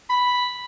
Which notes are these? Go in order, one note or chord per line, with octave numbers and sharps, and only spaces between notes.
B5